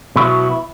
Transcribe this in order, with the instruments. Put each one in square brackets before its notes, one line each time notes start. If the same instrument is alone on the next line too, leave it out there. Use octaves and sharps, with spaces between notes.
[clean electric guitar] B2 F#3 B3 E4